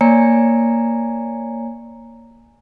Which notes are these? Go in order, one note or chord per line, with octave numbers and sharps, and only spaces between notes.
A#3 C#5 D5 G#5 A#5 C#7